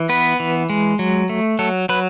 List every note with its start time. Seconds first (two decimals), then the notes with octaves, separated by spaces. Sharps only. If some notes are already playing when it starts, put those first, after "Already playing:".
Already playing: E3
0.09 B3 B4
0.40 E3
0.70 G#3
0.99 F#3
1.29 A3
1.59 F#3 A4
1.89 F#3 B4